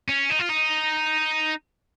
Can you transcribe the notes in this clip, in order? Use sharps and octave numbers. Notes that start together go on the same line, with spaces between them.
C#4
D#4
F4
D#4